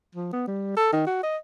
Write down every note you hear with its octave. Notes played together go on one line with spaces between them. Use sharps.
F3
B3
G3
A4
D#3
F#4
D#5